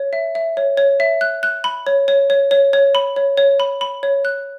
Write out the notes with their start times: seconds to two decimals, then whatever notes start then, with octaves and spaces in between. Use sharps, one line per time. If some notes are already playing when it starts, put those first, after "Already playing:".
Already playing: C#5
0.13 E5
0.35 E5
0.57 C#5
0.77 C#5
1.00 E5
1.21 F#6
1.43 F#6
1.64 B5
1.87 C#5
2.08 C#5
2.30 C#5
2.51 C#5
2.73 C#5
2.95 B5
3.16 C#5
3.37 C#5
3.60 B5
3.81 B5
4.03 C#5
4.25 F#6